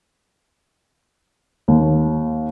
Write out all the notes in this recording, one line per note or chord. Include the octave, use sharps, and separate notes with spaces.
D#2